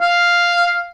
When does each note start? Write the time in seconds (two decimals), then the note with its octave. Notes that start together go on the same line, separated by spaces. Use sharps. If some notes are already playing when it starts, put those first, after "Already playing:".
0.01 F5